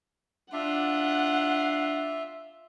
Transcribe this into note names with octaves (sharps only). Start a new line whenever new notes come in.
D4 F4 E5 F#5